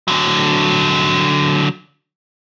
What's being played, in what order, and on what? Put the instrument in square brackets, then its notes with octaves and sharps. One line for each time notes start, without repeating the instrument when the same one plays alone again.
[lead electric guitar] D3 F#3